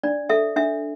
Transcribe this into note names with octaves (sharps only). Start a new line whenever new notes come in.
D4 D5
A4 E5
D4 E5